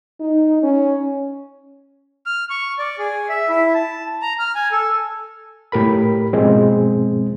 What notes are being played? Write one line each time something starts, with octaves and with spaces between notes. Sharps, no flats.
D#4
C#4
F6
C#6
D5
G#4
E5
E4
A5
A#5
F6
G#5
A4
A2 G4 A#4 B5
G#2 B2 F3 G#3 C4